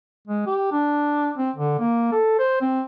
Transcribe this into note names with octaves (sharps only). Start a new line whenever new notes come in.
G#3
G4
D4
C4
D3
A#3
A4
C5
C4